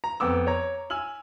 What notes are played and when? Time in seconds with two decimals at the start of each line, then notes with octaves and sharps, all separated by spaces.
0.04 A#5
0.20 F2 B3 D6 E6
0.47 C#5 A#5
0.90 G#5 E6 F6 F#7